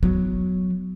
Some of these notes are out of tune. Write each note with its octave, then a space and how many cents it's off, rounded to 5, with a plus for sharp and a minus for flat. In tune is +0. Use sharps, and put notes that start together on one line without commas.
F#3 -5 B3 +10